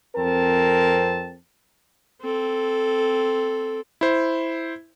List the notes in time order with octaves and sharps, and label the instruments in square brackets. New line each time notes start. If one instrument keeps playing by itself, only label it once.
[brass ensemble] F2 C4 A#4 A5
[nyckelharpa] C4 A4
[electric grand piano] E4 C5